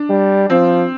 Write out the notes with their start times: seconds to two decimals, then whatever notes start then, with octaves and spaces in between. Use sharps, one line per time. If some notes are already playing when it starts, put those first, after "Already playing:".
Already playing: D4
0.10 G3
0.50 F3 C4